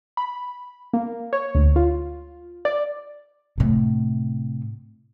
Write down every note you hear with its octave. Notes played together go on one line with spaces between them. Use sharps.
B5
A#3
C#5
D2
F4
D5
A2 C3